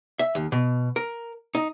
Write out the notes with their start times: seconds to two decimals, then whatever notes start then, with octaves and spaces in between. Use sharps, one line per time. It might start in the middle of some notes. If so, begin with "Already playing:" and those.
0.19 E5
0.35 D#2
0.52 B2
0.96 A#4
1.55 D#4